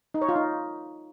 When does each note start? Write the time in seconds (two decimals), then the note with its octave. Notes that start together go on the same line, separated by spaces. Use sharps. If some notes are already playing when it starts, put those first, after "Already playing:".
0.14 D#4
0.22 C#5
0.29 F4
0.36 D#4